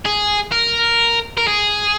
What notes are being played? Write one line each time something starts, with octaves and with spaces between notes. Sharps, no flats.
G#4
A#4
A#4
G#4